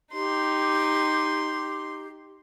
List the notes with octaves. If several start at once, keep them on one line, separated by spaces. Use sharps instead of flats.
D#4 G4 C6